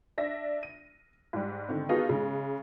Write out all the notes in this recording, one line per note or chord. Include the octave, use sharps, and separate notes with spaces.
D4 E5 A#6
D#7
G#2 G3
D3 D#3 C4
B3 D#4 F4 F#4 G#4 A4
C#3 G#3